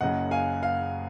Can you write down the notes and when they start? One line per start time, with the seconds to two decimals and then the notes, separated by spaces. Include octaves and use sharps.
0.01 F#1 F#2 C#3 D#5 F#5
0.31 F5 G#5
0.63 F5